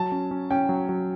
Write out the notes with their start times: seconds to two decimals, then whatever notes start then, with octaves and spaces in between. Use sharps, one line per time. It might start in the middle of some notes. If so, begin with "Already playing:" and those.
Already playing: F#3 A5
0.12 C#4
0.31 C#4
0.50 C#4 G5
0.69 F#3
0.89 F#3